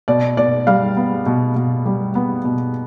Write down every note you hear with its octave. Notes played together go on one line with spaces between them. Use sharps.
B2 D5
B2 D5
G3 F5
B3
B2
B2
G3
B3
B2